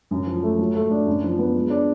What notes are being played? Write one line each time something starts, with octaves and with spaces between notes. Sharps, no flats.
F#2
F3
A3
F#3
A3
D4
F#2
F3
B3
G#3
D4